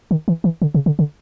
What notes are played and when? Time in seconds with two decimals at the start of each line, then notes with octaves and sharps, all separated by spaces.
0.11 D#3
0.28 E3
0.44 E3
0.62 D3
0.74 C#3
0.86 D3
0.99 D3